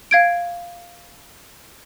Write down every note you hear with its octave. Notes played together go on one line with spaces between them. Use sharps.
F5 G#6 D7